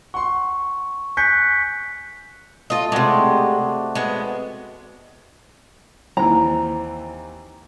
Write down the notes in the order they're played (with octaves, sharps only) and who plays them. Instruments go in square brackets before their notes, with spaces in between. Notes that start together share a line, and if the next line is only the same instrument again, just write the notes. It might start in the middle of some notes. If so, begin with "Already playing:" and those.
[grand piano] F#5 C6 [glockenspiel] C#6
[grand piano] G#5 G6 [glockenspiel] F#6 B6 C#7
[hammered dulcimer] A3 [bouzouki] F4 D#5
[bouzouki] C3 G#3 [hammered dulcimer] C4 F#4 D5
[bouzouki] G#3 B3
[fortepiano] D#2 E3 C4 [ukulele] A#5